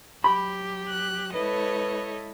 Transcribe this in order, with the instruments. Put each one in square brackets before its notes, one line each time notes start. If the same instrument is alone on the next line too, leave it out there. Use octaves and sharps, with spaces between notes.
[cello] F#3 G4 [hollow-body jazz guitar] B5
[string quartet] F#6
[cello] G#3 E4 [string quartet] A4 C#5 D#5 [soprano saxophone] B4